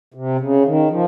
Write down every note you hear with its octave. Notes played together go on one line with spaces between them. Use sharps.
C3
C#3
D#3
F3